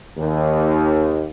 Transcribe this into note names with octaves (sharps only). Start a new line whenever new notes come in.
D#2